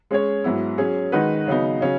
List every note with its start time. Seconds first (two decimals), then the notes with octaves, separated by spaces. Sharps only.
0.11 G#3 C#4 G#4 C#5
0.44 G#2 F#3 B3 E4
0.78 F#3 C#4 G#4
1.12 D#3 G#3 D#4 F#4 B4
1.47 C#3 F#3 B3 D#4
1.81 C#3 F#3 C#4